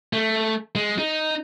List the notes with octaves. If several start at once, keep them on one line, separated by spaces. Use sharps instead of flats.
A3
G#3
D#4